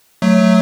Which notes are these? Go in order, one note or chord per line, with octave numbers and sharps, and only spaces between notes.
F#3 A3